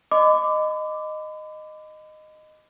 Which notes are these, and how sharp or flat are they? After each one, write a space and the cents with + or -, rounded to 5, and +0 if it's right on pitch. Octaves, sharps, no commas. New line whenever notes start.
D#5 -10 B5 +40 D6 +0